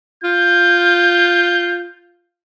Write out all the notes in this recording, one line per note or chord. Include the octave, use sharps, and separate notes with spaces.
F4 G6